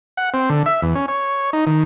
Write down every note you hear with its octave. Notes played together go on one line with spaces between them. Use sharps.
F#5
C4
D3
E5
E2
C#4
C#5
D#4
D#3